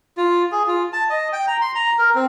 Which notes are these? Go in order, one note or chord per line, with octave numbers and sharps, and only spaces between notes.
F4
G#4
F4
A5
D#5
G5
A#5
C6
A#5
A#4
C4